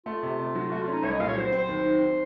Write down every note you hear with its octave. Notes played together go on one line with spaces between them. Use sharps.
A3 F4
C3
C3
F#3
A3 F#4
F4
C#4 D#4
C2 C#5
D#5
A#2 F5
C#5
F#3 C5
C5
C4
C5
D#2
D#3
D#3